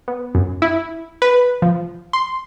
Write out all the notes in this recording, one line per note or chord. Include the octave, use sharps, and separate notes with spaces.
B3
F#2
E4
B4
F3
C6